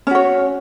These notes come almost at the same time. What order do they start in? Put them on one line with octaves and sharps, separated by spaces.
C#4 F#4 C#5